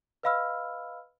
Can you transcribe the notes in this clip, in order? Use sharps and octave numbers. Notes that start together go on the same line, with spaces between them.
B4 D#5 F5 B5 E6 F6